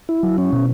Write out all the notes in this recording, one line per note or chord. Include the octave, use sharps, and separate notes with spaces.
E4
F#3
C#4
B2